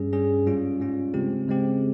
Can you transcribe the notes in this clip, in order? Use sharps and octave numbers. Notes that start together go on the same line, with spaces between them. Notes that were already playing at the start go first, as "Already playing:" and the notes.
Already playing: G2 G3 C#4 G#4
G2 G3 C#4 G#4
G#2 G3 C#4 F4
G#2 G3 C#4 F4
C#3 G#3 C4 G4
C#3 G#3 C4 G4